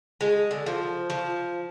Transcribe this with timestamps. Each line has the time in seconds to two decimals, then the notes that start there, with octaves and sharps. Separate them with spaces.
0.21 G#3
0.51 D3
0.66 F3
1.10 F3